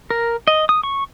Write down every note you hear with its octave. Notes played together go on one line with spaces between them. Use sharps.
A#4
D#5
D#6
C#6